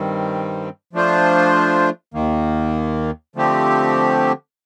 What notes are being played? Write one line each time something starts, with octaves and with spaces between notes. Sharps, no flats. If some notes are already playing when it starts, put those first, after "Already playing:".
Already playing: G2 D#3 G3 C4
F3 A3 D4 F4 C5
D#2 D#3 A#3
D3 F3 A3 C4 G4